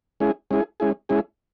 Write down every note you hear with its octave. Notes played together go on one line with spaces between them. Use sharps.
G#3 C#4 E4 G#4
G#3 C#4 E4 G#4
G#3 C#4 E4 G#4
G#3 C#4 E4 G#4